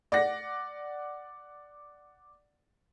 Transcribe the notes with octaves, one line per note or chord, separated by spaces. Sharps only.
D5 F#5 A#6